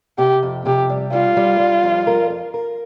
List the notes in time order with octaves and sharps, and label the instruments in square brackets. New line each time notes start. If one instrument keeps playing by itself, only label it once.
[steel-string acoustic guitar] C3 [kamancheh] G4
[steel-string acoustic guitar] F2
[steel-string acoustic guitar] C3 [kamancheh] G4
[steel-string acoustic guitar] G3
[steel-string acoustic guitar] G3 [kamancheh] F4
[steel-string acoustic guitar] G3
G3
F2
A#4
A#4
A#4